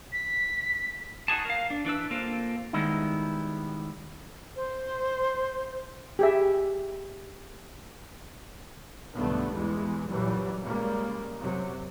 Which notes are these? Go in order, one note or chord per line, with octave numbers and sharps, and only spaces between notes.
B6
D#4 F#4 G#4 A5
A#4 F5
D4
E3 D4 B4 E6
A#3 C4 F4 A4
D#3 G3 G#3 B3 D#4 E4
C5
G4 G#4 E5
B1 G2 D3 A3 B3
E2 E3 G3 G#3
F#2 A#2 E3 F#3 G3
C#3 G3 G#3 A#3
F#2 C3 F#3